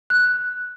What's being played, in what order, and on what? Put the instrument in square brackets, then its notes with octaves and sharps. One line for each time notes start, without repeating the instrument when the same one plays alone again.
[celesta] F#6